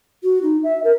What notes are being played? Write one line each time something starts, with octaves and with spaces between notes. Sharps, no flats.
F#4
D#4
E5
A#4